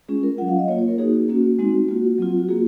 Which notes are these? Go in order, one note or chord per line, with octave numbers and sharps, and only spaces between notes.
G#3 C#4 F4 G#4
A#4
F#3 C#4 F4 F#5
F5
D#5
A#3 F4 C#5
C#5
A#4
A#3 D#4 F#4 G#4
A#3 C#4 F#4
G#3 C4 D#4 F#4
A#3 F4 F#4
F#3 C4 F4
F#4
A#3 F4 G#4